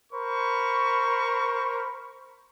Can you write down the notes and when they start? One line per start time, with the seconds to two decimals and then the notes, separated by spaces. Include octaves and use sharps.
0.13 A#4 C5 B5 C#6